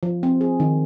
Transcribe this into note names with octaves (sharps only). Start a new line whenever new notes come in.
F3
C4
G#4
D#3